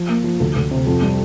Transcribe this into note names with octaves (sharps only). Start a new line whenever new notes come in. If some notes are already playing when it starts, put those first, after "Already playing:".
Already playing: F3
A#3
F3
D2
D2
C3
F2
G3